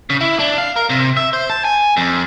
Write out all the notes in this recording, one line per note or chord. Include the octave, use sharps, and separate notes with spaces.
C#3
E4
D4
F5
A#4
C3
E5
C5
A5
G#5
F2